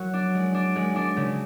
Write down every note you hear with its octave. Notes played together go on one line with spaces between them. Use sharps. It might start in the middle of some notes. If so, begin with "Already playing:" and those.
Already playing: F#3 F#4
D4
G#3
D4
G#3
D4
C#3